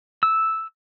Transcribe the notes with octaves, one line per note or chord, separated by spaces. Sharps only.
E6